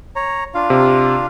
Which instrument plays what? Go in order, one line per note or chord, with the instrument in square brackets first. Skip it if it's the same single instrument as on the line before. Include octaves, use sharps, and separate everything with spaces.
[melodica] C#5 A#5
D4 F4 F5
[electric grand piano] C3